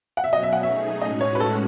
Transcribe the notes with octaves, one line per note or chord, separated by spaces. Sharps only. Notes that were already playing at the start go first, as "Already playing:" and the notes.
F#5
B2 F#3 C#4 E5
D#5
E5
F#5
A3 D#4 G#4 E5
A2 G#3 C#4 F#4 D#5
C#5
B4
A4